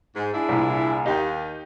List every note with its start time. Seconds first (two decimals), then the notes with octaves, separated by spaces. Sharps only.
0.16 G#2
0.34 D4 E4 G#4
0.49 C2 A#2
1.06 D#2 D#4 G4